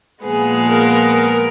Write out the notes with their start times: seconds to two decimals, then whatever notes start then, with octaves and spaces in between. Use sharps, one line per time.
0.23 A#2 F3 G#3 B3 G#4
0.68 A#4
1.12 A#4